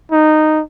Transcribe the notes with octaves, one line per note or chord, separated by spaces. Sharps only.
D#4